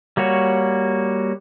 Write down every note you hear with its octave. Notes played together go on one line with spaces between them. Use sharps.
G3 A#3 F#4 C#5